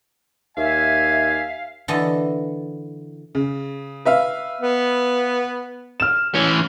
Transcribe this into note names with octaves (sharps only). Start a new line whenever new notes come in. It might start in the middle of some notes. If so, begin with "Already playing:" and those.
D#2 E5 F5 G#5
D3 E3 D#5 A5
C#3
B4 E5 F5
B3
F6 E7
E3 C#4